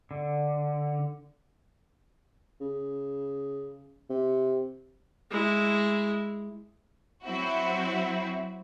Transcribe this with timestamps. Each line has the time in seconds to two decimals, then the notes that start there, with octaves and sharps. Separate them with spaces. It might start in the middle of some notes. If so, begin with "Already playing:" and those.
0.11 D3
2.61 C#3
4.10 C3
5.31 G#3 E4
7.25 F#3 C4 E4 F#4